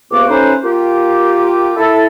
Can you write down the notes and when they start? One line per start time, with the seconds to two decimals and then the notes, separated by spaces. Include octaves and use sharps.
0.11 C#2 C3 A#3 B3 F#4 D6
0.28 F#3 A3 C#4 D#4 B4 C5
0.63 A#3 F4 G4
1.76 E4 A4